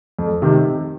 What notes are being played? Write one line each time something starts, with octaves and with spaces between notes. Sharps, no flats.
F2
C3 D#3